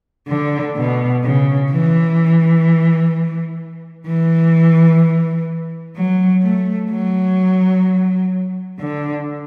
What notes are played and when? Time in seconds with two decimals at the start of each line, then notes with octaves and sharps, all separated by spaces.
0.28 D3
0.76 B2
1.23 C#3
1.71 E3
4.06 E3
5.96 F#3
6.42 A3
6.91 F#3
8.79 D3